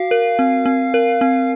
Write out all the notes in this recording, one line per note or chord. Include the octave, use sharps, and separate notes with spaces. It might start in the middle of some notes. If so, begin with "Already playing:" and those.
Already playing: F#4 F5
A#4
C4
C4
A#4
C4